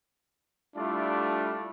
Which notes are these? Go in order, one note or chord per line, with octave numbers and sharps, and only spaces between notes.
G3 A3 D4 E4 F4 D5